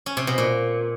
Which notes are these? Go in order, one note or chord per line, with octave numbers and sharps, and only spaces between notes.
C#4
C3
B2
A#2